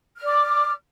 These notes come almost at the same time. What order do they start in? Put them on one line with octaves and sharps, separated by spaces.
F6 D5 D6